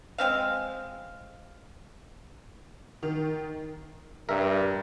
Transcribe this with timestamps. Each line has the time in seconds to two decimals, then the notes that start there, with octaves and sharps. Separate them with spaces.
0.18 G#3 C4 F5
3.03 D#3
4.29 G2 A#4 E5